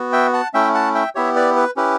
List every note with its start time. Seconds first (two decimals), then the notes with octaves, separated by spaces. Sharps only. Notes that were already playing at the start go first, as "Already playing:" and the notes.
Already playing: B3 F#4
0.13 E5 G5
0.33 F#5 A5
0.54 A3 C#4 E4 E5 G5
0.74 F#5 A5
0.95 E5 G5
1.15 B3 E4 G4 C#5 E5
1.36 B4 D5
1.56 B4
1.76 C#4 E4 G4 B4